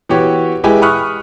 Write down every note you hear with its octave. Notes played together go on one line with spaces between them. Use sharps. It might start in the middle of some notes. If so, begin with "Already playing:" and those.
E3 B3 F#4 G4 C#5
G#3 E4 G4 B4 G5 G#5
B5 C#6 D#6 F6 F#6